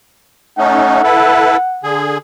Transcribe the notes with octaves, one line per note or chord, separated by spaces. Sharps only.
A3 C#4 D#4 F#5
E4 A4 B4
D3 G#4